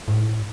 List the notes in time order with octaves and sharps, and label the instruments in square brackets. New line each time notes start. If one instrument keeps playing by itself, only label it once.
[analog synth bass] A2